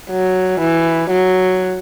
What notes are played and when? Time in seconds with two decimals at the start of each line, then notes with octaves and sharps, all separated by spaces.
0.10 F#3
0.60 E3
1.11 F#3